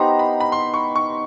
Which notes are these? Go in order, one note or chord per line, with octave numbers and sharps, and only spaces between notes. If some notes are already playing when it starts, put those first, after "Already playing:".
Already playing: B3 D#4 G4 C5 A#5
B5
B5
C6
C#6
C#6